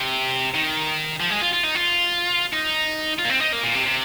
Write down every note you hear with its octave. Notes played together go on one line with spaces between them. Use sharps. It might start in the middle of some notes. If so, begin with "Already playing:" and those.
Already playing: C3
D#3
F3
G#3
F4
F4
D#4
F4
D#4
F4
A#3
C4
D#4
A#3
A#2
C3
C3